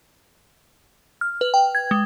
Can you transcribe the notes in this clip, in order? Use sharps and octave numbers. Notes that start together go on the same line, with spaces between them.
F6
B4
G5
G#6
G#3